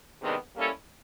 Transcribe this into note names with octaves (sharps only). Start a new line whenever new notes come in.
C3 D#3 G#3 B3 D4
G3 A#3 C#4 E4 A4